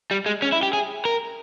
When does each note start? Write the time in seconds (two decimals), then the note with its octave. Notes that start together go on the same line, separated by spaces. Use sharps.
0.11 G3
0.26 G#3
0.42 C#4
0.52 E4
0.63 G4
0.73 G#4
1.05 A#4